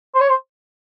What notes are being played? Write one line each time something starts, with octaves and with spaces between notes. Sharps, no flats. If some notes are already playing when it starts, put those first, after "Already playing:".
C5
C#5
C5